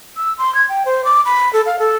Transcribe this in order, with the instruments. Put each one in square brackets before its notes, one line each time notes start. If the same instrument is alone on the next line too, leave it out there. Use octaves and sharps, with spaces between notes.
[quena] E6
C6
G#6
G5
C5
D6
B5
A4
F5
A4